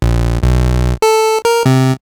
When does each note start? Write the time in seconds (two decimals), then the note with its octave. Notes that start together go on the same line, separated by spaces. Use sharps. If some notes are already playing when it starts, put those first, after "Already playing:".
0.02 A#1
0.43 B1
1.02 A4
1.45 A#4
1.66 C3